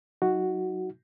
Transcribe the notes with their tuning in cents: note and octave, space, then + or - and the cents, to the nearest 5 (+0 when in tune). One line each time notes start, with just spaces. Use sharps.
F#3 +5 D#4 +30 F#4 +0